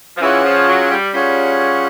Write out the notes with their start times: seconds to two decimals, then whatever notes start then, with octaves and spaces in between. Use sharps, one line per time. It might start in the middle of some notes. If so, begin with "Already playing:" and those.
0.17 F3
0.21 E3 C#4 F4 G#4 C#5 F#5
0.44 F3
0.68 F#3
0.91 G3
1.13 G3 C#4 F4 G#4 C#5 F#5